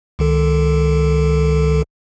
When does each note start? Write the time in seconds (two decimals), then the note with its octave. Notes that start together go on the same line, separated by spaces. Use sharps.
0.19 C#2 D#3 A4